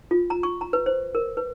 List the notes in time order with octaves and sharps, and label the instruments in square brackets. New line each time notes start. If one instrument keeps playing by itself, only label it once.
[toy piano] F4
A#5
C#6
A#5
B4
C5
A#4
B4